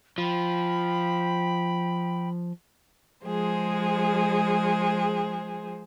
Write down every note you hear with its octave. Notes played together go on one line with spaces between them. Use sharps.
F3 G5 B5
F3 G#3 G#4 C5